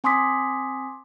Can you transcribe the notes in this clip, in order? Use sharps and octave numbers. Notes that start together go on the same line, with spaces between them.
C4 G#5 C6 D6 D#6 B6